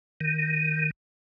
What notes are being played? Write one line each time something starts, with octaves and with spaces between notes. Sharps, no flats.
D#3